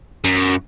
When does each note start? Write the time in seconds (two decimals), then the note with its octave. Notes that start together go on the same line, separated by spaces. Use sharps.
0.24 F#2